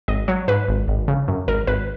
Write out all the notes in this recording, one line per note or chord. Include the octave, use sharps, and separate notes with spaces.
G#1 D#5
F#3 C#5
G#2 B4
G#1
G#1
C#3
F#2
G#1 A#4
G#1 B4